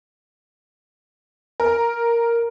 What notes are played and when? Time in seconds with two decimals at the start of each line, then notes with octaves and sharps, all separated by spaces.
1.60 A#4